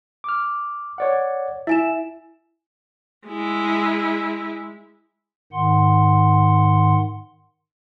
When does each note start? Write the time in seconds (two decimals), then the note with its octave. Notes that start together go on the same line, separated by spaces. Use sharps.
0.24 D6 F6
0.98 C#5 D5 F#5
1.67 E4 E5 G#5 E7
3.27 G#3 E4
5.52 G#2 D#3 F#5 C6